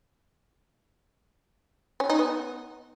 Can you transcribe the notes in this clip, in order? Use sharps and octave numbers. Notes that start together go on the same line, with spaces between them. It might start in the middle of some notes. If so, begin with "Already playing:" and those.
C#4
D#4
B3